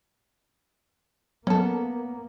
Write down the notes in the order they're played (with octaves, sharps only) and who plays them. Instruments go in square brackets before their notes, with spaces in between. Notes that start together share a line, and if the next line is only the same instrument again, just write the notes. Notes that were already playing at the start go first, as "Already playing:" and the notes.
[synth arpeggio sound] F#3 [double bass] A#3 [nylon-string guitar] B3 [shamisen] C#4 A4